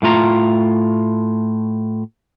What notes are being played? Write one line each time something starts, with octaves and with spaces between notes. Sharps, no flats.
A2 A3 F4 A#5